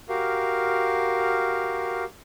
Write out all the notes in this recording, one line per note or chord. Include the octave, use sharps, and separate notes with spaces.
F#4 G4 A#4 F5